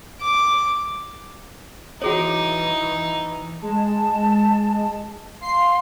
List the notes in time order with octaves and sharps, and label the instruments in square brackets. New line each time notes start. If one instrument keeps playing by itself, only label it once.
[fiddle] D6
[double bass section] E3 [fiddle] D#4 [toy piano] F#4 G#4 C#5
[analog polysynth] G#3 [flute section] A5
[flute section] F5 C6 [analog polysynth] C7